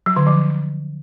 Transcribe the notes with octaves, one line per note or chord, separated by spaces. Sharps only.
F#3
D3
F3